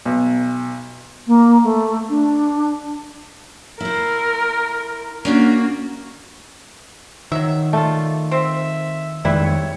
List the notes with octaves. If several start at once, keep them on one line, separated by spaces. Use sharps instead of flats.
B1
A#3
A3
D4
E4 A#4 C5
A#3 C#4 D4 F#4 D5
D#3 F#3 E5
A3 F4 D5
C4 E5
F2 D#3 G3 G#3 E4 B4 E5
C#5